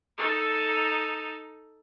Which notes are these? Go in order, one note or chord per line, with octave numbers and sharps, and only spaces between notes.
D#4 A4